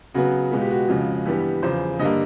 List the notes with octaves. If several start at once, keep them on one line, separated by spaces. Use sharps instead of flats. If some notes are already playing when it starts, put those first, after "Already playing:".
C#3 F#3 B3 F#4
B2 G#3 B3 F4
G4
F#4
F2 C#3 F3 G#3
G2 E3 G3 B3 G4
E2 C#3 F3 C5
G2 D3 G3 A#3 D#5